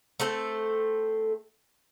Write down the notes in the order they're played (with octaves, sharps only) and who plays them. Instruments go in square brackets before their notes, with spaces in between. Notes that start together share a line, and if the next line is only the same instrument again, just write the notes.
[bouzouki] A3 C4 A4